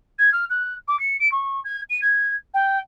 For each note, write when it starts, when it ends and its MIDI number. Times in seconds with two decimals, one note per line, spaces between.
0.18 0.30 92
0.32 0.45 89
0.50 0.74 90
0.88 0.98 86
0.99 1.17 97
1.19 1.30 98
1.32 1.60 85
1.64 1.81 92
1.90 2.01 99
2.01 2.34 92
2.54 2.78 79